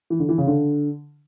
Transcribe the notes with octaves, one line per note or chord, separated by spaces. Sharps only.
E3
D3
E3
C#3
D3